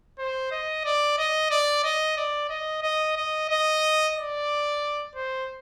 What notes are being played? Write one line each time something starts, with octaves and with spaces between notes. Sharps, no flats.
C5
D#5
D5
D#5
D5
D#5
D5
D#5
D#5
D#5
D#5
D5
C5